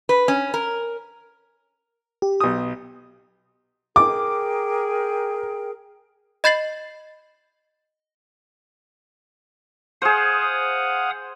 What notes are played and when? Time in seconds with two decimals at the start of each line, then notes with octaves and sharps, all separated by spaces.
0.09 B4
0.28 C#4
0.54 A#4
2.22 G4
2.40 B1 D#6
3.96 G#4 A#4 G5 D6
6.44 D#5 B5 G6 A6 C7 F#7
10.02 G#4 C5 F5 F#5 D#6